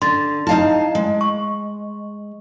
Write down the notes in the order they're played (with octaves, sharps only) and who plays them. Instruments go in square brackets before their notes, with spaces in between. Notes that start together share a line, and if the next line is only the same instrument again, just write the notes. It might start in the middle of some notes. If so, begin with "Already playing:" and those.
[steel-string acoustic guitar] D3 [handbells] C6 A6
[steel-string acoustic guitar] D#4 F5 A5 [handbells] E4 D#5
[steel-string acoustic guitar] G#3
[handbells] C#6